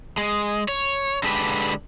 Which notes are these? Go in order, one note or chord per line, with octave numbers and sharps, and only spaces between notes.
G#3
C#5
D3 G#3 D4 G4 B4